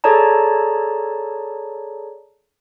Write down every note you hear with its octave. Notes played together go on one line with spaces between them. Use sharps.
G#4 A4 C#5 D5 A5 A#5